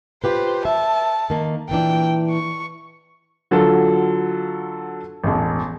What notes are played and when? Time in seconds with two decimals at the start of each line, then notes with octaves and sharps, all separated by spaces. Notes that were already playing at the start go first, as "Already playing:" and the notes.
0.24 F4 G4 B4 C5
0.65 E5 A5
1.30 D#3 A#3
1.69 A#2 E3 D4 G5
2.30 C#6
3.51 D3 F#3 F4 A4
5.24 E1 A1